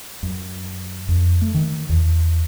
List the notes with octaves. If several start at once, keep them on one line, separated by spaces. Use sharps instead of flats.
F#2
F2
A3
D#3
E2